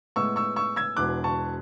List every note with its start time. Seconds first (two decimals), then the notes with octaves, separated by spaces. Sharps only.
0.16 A2 G#3 B3 C#6 E6
0.36 C#6 E6
0.56 C#6 E6
0.76 E6 G#6
0.97 E1 E2 B2 D6 F#6
1.24 A5 C#6